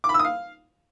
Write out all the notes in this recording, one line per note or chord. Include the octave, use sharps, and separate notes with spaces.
D6
B5
E6
D#6
F5